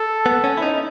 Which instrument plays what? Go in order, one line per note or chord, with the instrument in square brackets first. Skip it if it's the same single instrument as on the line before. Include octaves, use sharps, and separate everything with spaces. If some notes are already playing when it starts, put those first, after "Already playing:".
Already playing: [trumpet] A4
[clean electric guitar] B3
C#4
E4
D#4